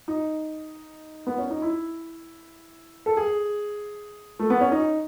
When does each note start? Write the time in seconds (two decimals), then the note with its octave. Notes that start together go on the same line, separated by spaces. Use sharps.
0.08 D#4
1.27 B3
1.38 C#4
1.51 D#4
1.62 E4
3.06 A4
3.17 G#4
4.39 A3
4.50 B3
4.61 C#4
4.72 D#4